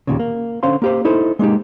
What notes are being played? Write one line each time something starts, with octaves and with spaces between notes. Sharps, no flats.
D#2 A#2 C#3
A#3
D3 C#4 C5 F5 C6
A#3 G4 C5
D#4 E4 A4 C5
G#3 A#3 D#4 G4